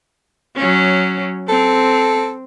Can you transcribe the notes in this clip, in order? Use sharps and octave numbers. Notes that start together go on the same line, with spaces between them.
F#3 C#4
C4 A4